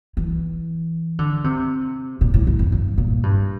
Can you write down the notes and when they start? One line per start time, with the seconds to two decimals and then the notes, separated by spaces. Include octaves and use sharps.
0.17 E3
1.19 D3
1.44 C3
2.21 A#2
2.34 A2
2.47 A2
2.59 F2
2.72 G2
2.98 A#2
3.23 G2